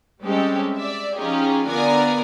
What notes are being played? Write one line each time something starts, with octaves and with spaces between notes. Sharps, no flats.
G3 G#3 C4 C#4 G4 A4
D5 E5
F3 C#4 D#4 F4 G4 G#4
D3 B3 F4 A#4 D5 G#5